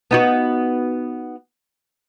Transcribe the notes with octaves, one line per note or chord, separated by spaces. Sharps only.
B3 D#4 F#4